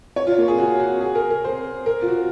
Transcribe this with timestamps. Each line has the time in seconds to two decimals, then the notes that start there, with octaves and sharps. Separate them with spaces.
0.16 C#5
0.27 F4
0.38 A#3
0.48 G#4
0.58 F#4
0.80 F#4
1.01 G#4
1.15 A#4
1.30 A#4
1.44 C5
1.86 A#4
2.02 F4
2.07 F#4